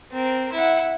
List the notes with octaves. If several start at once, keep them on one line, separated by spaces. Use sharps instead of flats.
C4 A#4
E4 F#5